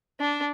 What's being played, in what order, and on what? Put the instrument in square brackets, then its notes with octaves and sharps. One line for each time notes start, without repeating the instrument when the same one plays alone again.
[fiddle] D4